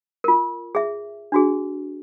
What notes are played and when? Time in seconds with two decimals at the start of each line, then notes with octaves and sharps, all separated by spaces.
0.24 F4 A#4
0.75 G#4 E5
1.32 D4 F#4 G#4